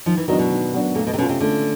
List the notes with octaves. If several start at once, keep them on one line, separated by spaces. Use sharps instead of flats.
D#3 F3
E3
D#3 F#3 B3 D4 F#4
B2
D#3
F#3 B3 D4 F#4
A#2 A3
B2
C3
B2 C#4 F4
C3
D3 A3